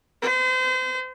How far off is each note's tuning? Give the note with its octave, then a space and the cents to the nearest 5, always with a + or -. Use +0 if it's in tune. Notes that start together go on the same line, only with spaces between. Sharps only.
C5 -35